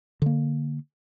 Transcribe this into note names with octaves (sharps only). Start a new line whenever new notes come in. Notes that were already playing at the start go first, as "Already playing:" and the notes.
D3 A#3